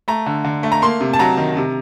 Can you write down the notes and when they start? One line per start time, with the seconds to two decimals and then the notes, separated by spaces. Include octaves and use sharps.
0.08 A3 A#5
0.26 D3
0.44 D3
0.63 A3
0.72 A#5
0.82 A#3 C6
1.01 C3
1.13 A5
1.19 F#3 A#5
1.37 D#3
1.57 C3